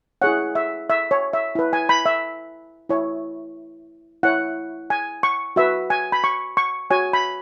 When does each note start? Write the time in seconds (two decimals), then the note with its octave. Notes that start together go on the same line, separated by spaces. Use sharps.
0.22 E4 G#4 C#5 F#5
0.55 E5
0.90 E5
1.11 C#5
1.33 E5
1.55 E4 B4
1.73 G#5
1.89 B5
2.06 E5
2.89 E4 C#5
4.23 E4 C#5 F#5
4.90 G#5
5.23 C#6
5.56 F#4 B4 E5
5.90 G#5
6.12 B5
6.24 C#6
6.57 C#6
6.90 F#4 C#5 G#5
7.13 B5